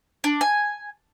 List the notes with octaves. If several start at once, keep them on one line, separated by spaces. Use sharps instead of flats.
D4
G#5